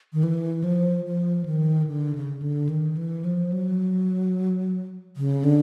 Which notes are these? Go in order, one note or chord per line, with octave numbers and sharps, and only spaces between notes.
D#3
E3
F3
F3
D#3
D3
C#3
D3
D#3
E3
F3
F#3
C#3
D3